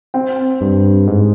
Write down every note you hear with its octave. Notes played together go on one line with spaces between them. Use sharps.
C4
G2
G#2